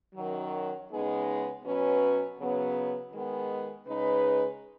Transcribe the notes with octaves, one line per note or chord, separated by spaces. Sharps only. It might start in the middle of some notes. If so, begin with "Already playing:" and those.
F#2 D#3 F#3
C#3 G#3 B3 D#4 G#4
B2 F#3 C#4 B4
C#3 F#3 B3
D#3 G#3 B3
C#3 G#3 D#4 B4